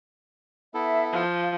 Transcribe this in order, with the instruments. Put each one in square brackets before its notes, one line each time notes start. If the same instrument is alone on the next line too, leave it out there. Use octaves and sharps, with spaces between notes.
[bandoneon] B3 E4 A4 [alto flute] E5
[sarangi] F3 [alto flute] F5